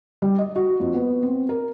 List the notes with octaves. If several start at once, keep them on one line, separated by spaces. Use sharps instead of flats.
G3
D#5
F#4
F2
B3
C4
A#4